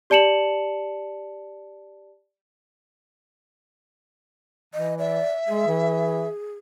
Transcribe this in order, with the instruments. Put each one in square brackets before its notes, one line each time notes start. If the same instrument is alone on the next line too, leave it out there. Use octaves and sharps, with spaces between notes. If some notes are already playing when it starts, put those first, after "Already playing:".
[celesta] G4 D5 A5 C#7 E7 F#7
[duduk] E3 [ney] D#5
[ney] D5 [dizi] E5
[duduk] G#3 [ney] G#4
[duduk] E3